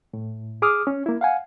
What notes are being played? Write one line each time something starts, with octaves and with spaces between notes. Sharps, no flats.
A2
G#4 D6 D#6 F6
C#4
A#3 E4
F5 F#5 G#5